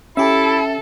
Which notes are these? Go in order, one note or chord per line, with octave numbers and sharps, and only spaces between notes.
C#4 E4 G4 A4 E5